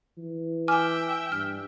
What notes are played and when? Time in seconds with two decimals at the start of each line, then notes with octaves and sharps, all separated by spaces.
0.18 E3
0.68 E5 G5 G#5 D6 F6
1.32 G2 F6